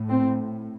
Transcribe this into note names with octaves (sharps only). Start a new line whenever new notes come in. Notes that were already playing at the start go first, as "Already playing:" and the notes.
Already playing: A2
C4